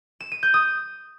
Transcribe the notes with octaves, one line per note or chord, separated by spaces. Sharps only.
E7
D#7
G6
D#6